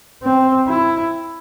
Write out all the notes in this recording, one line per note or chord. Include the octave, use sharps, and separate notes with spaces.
C4
E4